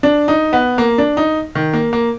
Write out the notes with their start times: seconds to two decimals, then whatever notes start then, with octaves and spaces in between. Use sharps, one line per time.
0.03 D4
0.28 D#4
0.53 B3
0.78 A#3
0.98 D4
1.17 D#4
1.55 D#3
1.74 A#3
1.93 A#3